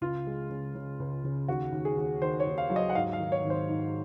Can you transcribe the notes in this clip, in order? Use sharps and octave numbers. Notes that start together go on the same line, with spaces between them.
C#2 F4
G#3
C#3
C#3
C#2
C#3
D#2 F#4
D#2
G#4
D#2
D#3 C5
C#5
D#2
F5
F#3
D#5
F#5
G#2 F5
F5
D#3
C#5
G#1
C5
G#2